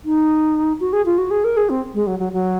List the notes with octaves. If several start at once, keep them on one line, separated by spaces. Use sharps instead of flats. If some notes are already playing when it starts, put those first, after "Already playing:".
D#4
F#4
G#4
F4
F#4
G#4
A#4
G#4
C4
G#3
F#3
F#3
F#3